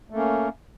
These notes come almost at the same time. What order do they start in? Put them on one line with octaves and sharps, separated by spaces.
A3 A#3 C#4